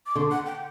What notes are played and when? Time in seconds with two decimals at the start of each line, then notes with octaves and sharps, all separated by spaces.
0.06 D6
0.16 D3 C6
0.31 F#5
0.46 G5